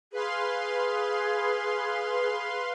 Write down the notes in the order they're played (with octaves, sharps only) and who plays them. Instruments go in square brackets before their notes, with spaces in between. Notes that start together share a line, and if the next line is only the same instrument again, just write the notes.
[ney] G#4 [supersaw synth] B4 F5 C6